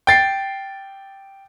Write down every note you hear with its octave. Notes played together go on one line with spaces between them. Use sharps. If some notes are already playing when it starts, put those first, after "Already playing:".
G5 A6 C7